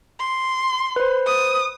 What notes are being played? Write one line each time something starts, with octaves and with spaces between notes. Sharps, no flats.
C6
B4 C5
D#6